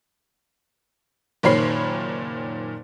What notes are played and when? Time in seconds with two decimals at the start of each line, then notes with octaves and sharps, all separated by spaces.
1.43 F#1 A#2 D#3 C#5 B5 C7